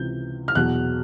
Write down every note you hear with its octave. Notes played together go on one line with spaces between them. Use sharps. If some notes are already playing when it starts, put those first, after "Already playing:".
Already playing: C#2 C3 E3 G6
F6
E2 B2 F#3 F#6